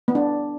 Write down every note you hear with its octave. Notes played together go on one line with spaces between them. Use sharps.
B3
D4